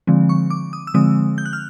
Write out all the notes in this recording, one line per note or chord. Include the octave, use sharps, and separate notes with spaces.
D3 F3 G#3 C4
C#6
D6
D#6
E6
D3 F3 G#3 C4 D#6
G6
F#6
F6